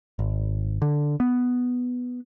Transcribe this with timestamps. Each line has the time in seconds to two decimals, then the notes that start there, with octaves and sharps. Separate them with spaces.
0.19 G#1
0.82 D3
1.20 B3